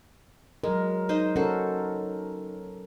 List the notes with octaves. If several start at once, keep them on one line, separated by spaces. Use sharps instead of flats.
F#3 G#3 A#4
D#4 C5 D#5
C#4 F#4 A4 A#4 C5